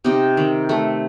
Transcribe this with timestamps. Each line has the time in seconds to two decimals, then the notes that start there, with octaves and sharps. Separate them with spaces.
0.04 C3 D#4 G4
0.37 D#3
0.69 A3